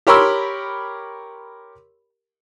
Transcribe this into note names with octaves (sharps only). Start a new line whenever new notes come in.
G4 A#4 C#5 B5 C6 E6